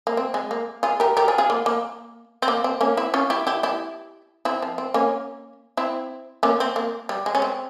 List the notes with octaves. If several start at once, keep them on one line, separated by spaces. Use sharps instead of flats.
A#3
C4
G#3
A#3
F4 G#4
G4 A#4
G4 A#4
F4 G#4
F4 G#4
A#3
A#3
C4
A#3
C4
A#3 C#4
C4 E4
C#4 F4
E4 G4
E4 G4
E4 G4
C4 E4
F3
C4
A#3 C#4
C4 E4
A#3 C#4
C4
A#3
G3
G#3
C#4
C4